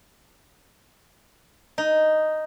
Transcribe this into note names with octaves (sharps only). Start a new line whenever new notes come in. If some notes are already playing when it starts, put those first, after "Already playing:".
D#4